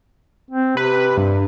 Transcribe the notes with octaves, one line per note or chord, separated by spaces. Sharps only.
C4
C3 B4
G2